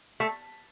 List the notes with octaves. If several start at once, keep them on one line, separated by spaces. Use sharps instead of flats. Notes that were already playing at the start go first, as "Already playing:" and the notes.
A3